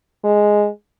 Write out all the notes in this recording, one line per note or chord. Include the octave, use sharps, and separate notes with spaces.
G#3